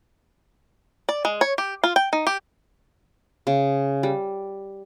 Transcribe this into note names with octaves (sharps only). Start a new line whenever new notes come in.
D5
G#3
C#5
G4
F4
G5
D#4
G4
C#3
G3